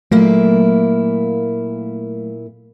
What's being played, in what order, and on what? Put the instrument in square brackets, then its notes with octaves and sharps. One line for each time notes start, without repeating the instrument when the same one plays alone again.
[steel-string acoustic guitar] A#2 A#3 E4 [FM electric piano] F#3 A3